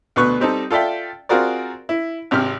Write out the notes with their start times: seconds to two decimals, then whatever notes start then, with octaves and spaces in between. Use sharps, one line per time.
0.16 D2 B2 B4 C#6 F#6
0.40 G3 C4 D#4 A4
0.71 F4 A4 D5 E5 G5
1.29 C4 F4 F#4 G#4 A#4 D5
1.89 E4
2.31 G#1 C3 G4 F6